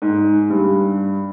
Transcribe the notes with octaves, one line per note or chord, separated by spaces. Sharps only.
G#2
G2